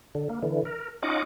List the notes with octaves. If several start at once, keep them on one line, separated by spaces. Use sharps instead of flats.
D3
A#3
D3 E3
A#4
C#4 D#4 F4 D#5 F#5 D6